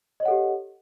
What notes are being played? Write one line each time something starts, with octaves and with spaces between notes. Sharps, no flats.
G4 A4 C#5 D#5 F#5